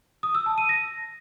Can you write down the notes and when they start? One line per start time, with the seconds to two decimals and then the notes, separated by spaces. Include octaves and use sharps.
0.23 D#6
0.35 E6
0.46 A5
0.58 D#7
0.69 A#6